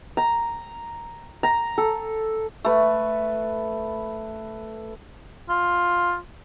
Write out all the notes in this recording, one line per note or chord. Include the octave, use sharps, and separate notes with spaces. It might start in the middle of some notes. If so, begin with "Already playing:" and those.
A#5
A#5
A4
A3 B4
F4